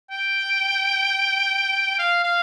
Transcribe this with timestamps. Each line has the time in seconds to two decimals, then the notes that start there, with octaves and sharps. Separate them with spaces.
0.11 G5
1.99 F5
2.24 F5